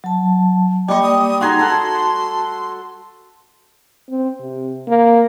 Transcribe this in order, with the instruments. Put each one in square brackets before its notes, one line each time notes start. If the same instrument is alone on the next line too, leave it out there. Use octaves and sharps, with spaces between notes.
[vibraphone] F#3 A5
[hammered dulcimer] G3 C#6 [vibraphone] A#3 D5 G5 [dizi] D#5
[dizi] D#6
[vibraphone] D#4 [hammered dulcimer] F#4 G#4 A#5 [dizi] C6
[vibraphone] F#4 A5 [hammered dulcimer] A4 F#5
[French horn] C4
C3
A#3